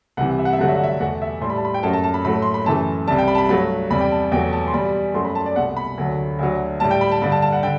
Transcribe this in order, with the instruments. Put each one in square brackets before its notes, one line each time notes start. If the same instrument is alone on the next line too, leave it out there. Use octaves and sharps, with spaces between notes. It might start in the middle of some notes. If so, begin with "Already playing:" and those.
[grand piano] C2 C3 E3 F#5
E5
F#5
E5
G2 D3 F#3 A3 F#5
E5
F#5
E5
E2 B2 A3 F#5
E5
A2 C6
G3 B5
A5
B5
G5
F#2 F#3 A3 A5
A5
A5
B5
A2 F#3 A3 B5
C6
B5
F#2 E3 A3 A5
C2 C3 G3 A5
G5
B5
A5
B5
G2 F#3 A3 B5
E2 C3 G3 B5
G5
A5
E2 B2 F#3 A3 G5
A5
C6
E2 B2 G3 B5
F#2 F#3 A3 C6
B5
A5
D5
C2 B2 A3 F#5
B5
D2 D3 F#3 A3
D2 D3 F#3
A2 G3 A5
G5
B5
A5
G2 D3 G3 B5
A5
A5
F#5
D3 G5